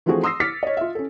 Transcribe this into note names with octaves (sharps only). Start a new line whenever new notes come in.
E3 F3 A3 C4 F#4 G#4
C6 D#6 E6 A#6 C7
D6 F6 A6 B6 C#7
C#5 D#5
F4 E5
C#4 A4